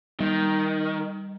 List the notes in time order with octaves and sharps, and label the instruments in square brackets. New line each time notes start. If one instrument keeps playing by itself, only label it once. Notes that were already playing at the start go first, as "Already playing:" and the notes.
[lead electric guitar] D#3 [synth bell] G3